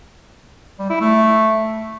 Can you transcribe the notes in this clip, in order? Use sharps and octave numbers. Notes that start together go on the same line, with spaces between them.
G3
E4
A3